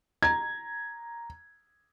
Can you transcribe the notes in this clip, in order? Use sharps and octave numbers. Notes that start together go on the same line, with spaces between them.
A#5 G#6